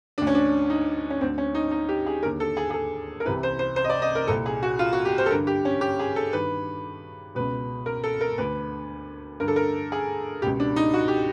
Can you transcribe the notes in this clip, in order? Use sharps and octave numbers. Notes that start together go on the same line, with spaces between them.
D2 D3 D4
C#4
D4
D#4
C#4
D2 D3 C4
C#4
D#4
D#4
G4
G#4
D#2 D3 A#4
A4
G#4
G#4
A4
A#4
C2 C3 E3 B4
C5
C5
C5
D#5
D5
D#5
A#4
C2 A#2 A4
G#4
F#4
F4
F#4
G4
C5
A4
G2 D3 A#4
G4
C#4
G4
G#4
A4
G2 D#3 B4
C#2 B2 B4
A#4
A4
A#4
D2 D3 B4
G2 D3 A#4
A4
A#4
G#4
C#2 B2 G4
D4
D#4
F#4
G4